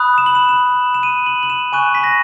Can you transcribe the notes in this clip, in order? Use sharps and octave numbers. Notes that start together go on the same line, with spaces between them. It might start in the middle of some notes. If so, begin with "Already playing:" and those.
Already playing: B5 D#6 F#6
E7
F#7
E7
E7
E7
D#7
F#7
F#7
E7
G#5 C#6 F#6 D#7
B6
A#6